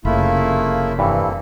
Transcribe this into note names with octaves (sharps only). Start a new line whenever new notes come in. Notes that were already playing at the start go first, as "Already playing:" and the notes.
F1 C#3 A3 A#3 E4 F4 B5
G2 E3 A#3 C4 A4